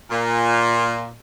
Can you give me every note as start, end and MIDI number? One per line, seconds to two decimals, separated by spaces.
0.11 1.11 46